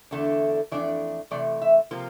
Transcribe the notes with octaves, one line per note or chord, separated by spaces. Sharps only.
E2 D3 A3 D4
F2 E3 A3 D4 D5
C3 E3 A3 D5
E5
C3 F3 A#3 F4